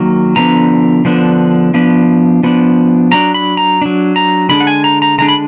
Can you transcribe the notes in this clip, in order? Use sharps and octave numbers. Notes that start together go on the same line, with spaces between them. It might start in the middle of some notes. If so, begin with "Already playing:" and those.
Already playing: D#3 F#3 A#3
D3 F3 B3 D4 A#5
D3 F3 B3 D4
F3 B3 D4
F3 B3 D4
F#3 D4 A#5
B5
A#5
F#3 D4
A#5
D3 G#3 D4 B5
F#5
G#5
A#5
A#5
D3 G#3 D4 A#5
B5